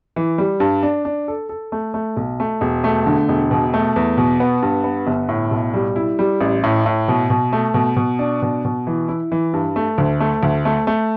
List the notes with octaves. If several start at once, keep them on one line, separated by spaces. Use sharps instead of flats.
E3
G3
G2
D4
D4
A4
A4
A3
A3
B1
A3
E1
A3
D3
E1
B2
A3
E2
B2
B3
G2
B3
G1
A2
B1
G3
E4
G3
A1
A2
A2
B2
B2
A3
B2
B2
D4
B2
B2
E3
E4
E3
G2
A3
D2
A3
D2
A3
A3